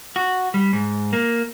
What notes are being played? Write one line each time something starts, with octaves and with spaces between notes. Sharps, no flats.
F#4
G3
G#2
A#3